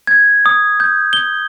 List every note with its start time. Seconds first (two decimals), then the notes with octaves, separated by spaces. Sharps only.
0.07 G#6
0.46 D#6
0.80 G6
1.13 G7